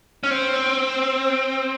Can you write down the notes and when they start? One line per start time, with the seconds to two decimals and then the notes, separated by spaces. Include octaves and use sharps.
0.23 C#4
0.31 C4